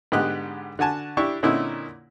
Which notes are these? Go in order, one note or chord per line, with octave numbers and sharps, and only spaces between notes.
G#2 D3 B3 G4 D#5 F#6
D3 F#4 G#5 A5
D4 E4 G4 C#6
A#2 D3 C4 C#4 D#4 E4